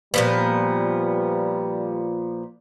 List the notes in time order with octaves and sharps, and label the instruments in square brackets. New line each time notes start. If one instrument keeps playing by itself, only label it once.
[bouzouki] A#2 F3 B3 [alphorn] G3